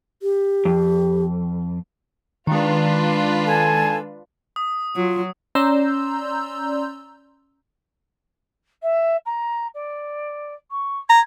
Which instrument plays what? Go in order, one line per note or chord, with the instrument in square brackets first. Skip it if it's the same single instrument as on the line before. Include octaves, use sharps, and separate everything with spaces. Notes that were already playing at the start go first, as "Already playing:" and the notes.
[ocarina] G4
[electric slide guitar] F2
[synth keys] D#3 G#3 [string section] D4 F4 B4
[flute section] A4 G#5 A5
[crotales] D#6
[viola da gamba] F#3 [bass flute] F4
[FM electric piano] C#4 D5 A#5 C6 E6 G6
[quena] E5
A#5
D5
C#6
[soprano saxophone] A#5 [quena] G#6